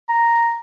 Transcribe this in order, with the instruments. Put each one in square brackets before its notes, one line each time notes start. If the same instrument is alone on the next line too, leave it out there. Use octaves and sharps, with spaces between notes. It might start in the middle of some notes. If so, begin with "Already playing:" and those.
[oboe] A#5